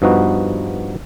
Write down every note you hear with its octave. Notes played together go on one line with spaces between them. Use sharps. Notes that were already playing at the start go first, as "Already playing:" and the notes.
G2 F3 B3 D#4 F#4